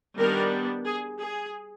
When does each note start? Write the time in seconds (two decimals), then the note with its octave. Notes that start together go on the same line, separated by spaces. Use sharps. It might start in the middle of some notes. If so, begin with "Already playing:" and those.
0.18 D#3 G3 B3 D4 A#4
0.85 G#4
1.19 G#4